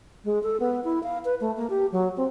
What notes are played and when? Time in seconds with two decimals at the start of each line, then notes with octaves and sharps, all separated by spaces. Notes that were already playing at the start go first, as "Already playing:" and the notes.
0.24 G#3
0.43 A4
0.60 B3
0.84 E4
1.03 F5
1.25 B4
1.41 A3
1.57 A#3
1.70 G4
1.92 F#3
2.17 C4